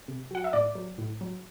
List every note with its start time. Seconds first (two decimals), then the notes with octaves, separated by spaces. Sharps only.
0.08 C3
0.31 F#3 F#5
0.44 E5
0.53 A2 D5
0.75 F#3
0.98 A2
1.21 F#3